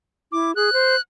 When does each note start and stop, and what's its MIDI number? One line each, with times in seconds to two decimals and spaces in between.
0.32 0.56 64
0.32 0.51 86
0.56 0.70 68
0.56 1.01 90
0.73 0.95 72